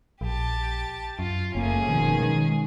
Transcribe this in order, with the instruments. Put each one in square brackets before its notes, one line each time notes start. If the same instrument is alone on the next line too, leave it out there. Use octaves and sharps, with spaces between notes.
[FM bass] A#1 [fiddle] G4 A5
[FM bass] F#2 [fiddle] F4
[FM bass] F#1 [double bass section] A3 A#3 [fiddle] C#4 G#4
[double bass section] B2 D#3 F3
[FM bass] D#3 [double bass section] G#3